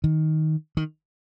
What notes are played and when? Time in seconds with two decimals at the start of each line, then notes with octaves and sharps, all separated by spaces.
0.04 D#3
0.77 D#3